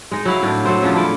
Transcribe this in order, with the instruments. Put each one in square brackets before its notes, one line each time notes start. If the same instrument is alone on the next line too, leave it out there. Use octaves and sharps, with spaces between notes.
[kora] G#3 D#4
F#3 E4 F5
A2 D4
F#3 A4 C5
C#3 F3 D4 F4
E4 A4 D5